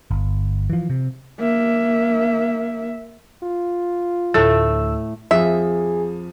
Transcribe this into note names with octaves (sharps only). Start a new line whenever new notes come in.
G1
E3 F3
C3
A#3 E5
F4
D2 A2 A3 A4 E6
F2 F3 G#4 E5